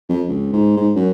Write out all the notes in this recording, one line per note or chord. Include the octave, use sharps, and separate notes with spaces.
F2
C#2
G#2
G#2
F#2